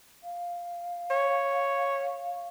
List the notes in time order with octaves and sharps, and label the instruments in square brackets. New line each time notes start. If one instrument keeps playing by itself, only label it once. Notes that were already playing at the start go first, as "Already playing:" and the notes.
[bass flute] F5
[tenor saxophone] C#5